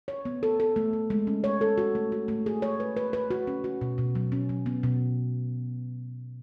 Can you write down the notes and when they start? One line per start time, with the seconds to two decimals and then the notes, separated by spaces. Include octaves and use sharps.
0.08 C#5
0.25 B3
0.43 A4
0.60 A4
0.76 A3
0.93 A3
1.10 G#3
1.27 C#4
1.44 C#5
1.61 A4
1.78 F#4
1.95 A3
2.12 F#4
2.28 A3
2.46 G#4
2.62 C#5
2.80 B4
2.97 B4
3.13 B4
3.31 F#4
3.47 C#4
3.64 F#4
3.81 B2
3.98 B2
4.15 F#3
4.32 C#4
4.49 F#3
4.66 B3
4.83 B2